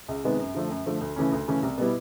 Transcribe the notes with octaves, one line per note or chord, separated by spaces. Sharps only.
C#2
C3 D#3 G#3 B3
F#2
D3 F3 A3
F#2
D3 F3 A3
D2
C#3 E3 A3 C#4
D2
C#3 E3 A3 C#4
C2
B2 G3 B3 E4